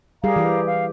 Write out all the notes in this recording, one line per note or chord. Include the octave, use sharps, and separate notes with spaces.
G3 G4 G#4 A#4 F5 A#5
E3 G4
F5